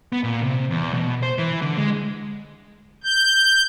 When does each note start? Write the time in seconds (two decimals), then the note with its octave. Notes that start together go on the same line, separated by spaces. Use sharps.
0.12 B3
0.24 A#2
0.43 C3
0.70 E2
0.94 B2
1.23 C5
1.38 E3
1.62 D3
1.77 G#3
3.04 G6